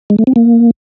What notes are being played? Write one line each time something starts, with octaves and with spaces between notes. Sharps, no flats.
G#3
A3
C4
A#3